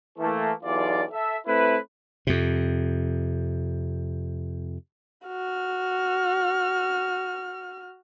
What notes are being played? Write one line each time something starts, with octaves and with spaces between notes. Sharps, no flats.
E3 A3 A#3
B1 E2 F4 D5
A4 E5
A3 C4 E4 B4
F2 C3
F#4 F6